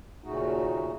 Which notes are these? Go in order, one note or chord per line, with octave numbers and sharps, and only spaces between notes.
D#2 A#2 C#3 A3 D#4 F#4